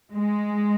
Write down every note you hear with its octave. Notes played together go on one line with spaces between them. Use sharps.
G#3